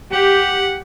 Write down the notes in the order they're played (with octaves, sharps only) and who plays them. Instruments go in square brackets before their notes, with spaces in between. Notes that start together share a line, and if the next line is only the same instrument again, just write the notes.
[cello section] G4 [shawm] F#5